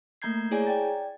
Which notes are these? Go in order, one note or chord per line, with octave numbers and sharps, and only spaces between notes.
A3 A#3 A#5 G6 G#6 C7
E4 G#4 C#5 D5 G#5 A#5
D5 G5 A6